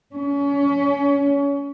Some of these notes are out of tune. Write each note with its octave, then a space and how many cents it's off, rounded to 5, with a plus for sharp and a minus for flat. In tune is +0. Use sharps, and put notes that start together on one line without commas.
C#4 +30